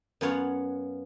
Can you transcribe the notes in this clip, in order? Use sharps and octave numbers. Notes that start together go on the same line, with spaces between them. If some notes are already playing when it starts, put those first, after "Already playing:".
F#2 B3 F4 C#5 F5 F#5